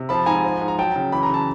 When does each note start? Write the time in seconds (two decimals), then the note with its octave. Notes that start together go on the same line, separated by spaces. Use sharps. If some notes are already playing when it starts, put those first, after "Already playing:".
Already playing: C3
0.09 F3 A5 B5
0.26 G#2 G#5 A#5
0.44 F3
0.61 G#2
0.68 A#5
0.78 F#3 G5 A5
0.96 C#3
1.12 E3 B5
1.23 A#5
1.29 C#3 A5